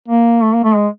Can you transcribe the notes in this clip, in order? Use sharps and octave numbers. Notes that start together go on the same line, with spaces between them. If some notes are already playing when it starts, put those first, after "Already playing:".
A#3
A3
A#3
A3
G#3